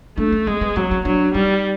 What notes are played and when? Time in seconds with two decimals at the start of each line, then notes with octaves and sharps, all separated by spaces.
0.17 A3 D4
0.32 C#4
0.47 G#3 C4
0.61 B3
0.76 F#3 C4
0.91 C#4
1.05 F#3 D4
1.34 G3 D#4